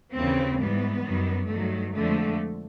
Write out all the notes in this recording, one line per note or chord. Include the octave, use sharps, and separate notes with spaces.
D#2 C#3 E3 C4
G#2 E3 G3 B3
F#2 D#3 G3
G2 D#3 F#3 A3
F2 D3 F3 G#3 A3